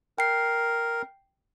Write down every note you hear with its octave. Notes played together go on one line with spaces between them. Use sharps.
A#4 G5 C7